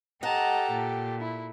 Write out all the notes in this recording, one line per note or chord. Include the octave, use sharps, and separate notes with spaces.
G4 A4 D#5 F#5 A5 A#5
A#2
E4